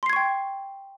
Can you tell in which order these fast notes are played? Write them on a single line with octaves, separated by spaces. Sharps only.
C6 C7 G#6 C#6 G5